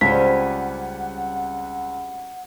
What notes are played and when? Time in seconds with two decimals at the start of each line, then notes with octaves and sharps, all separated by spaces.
0.01 C#2 G3 C4 C#4 F#5 B6